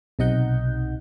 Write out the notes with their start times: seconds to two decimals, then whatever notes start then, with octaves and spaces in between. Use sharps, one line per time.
0.19 B1 C3 D#4 D#5 F#5 G6